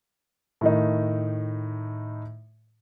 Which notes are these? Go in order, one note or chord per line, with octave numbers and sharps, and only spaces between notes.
A2 D#3 D#4